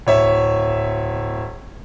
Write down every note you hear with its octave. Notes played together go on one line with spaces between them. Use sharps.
D1 C#5 E5